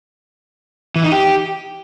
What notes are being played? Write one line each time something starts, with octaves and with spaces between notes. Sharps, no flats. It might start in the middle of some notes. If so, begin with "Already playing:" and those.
E3
D#4
G4